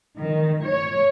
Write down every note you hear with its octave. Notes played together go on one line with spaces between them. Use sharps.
D#3
C#5